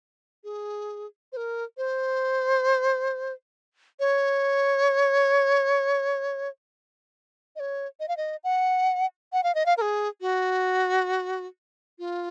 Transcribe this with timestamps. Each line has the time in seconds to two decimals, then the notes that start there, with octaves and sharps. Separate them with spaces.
0.44 G#4
1.32 C5
1.37 A#4
1.77 C5
4.00 C#5
7.56 D#5
7.60 C#5
8.00 D#5
8.08 F5
8.17 D#5
8.44 F#5
9.33 F#5
9.43 F5
9.55 D#5
9.66 F5
9.77 A#4
9.81 G#4
10.21 F#4
11.99 F4